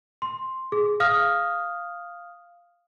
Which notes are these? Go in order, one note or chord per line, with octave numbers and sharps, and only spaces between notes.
C6
G#4
F5 D#6 F6